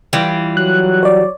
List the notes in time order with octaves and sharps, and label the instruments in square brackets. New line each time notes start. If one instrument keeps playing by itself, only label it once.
[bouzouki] E3 G3 F4
[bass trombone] F#3 [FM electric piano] F#6
[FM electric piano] C#5 D5